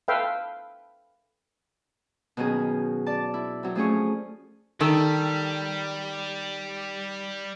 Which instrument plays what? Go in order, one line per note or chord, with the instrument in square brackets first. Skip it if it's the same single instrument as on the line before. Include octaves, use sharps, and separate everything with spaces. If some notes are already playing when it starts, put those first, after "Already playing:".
[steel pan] A4 B4 E5 F5 G5
[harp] B2 D#3 F#3 C#4 G#4
D5 A5
E4
F#3 C4
F3 A3 C#4 G#4 C#6
[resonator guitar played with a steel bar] D#3 A4 [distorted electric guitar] G3